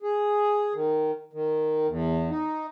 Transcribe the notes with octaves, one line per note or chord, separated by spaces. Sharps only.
G#4
D#3
D#3
E2
D#4